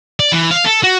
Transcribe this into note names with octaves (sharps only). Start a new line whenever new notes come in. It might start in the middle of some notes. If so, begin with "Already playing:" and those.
D5
E3
F5
A4
F#4